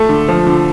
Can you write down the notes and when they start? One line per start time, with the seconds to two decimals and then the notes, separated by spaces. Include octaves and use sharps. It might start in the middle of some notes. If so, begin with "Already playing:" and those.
Already playing: A3 A4
0.09 D3
0.28 F3
0.47 D3